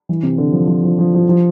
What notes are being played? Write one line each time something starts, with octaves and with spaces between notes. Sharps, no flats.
E3
C3
D3
F3
F3
F3
F3
F3
F3